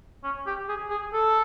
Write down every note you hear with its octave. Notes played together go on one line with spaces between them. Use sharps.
C#4
G4
G#4
G#4
A4